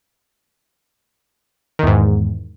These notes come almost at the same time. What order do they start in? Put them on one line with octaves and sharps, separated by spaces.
D#3 E2 G#2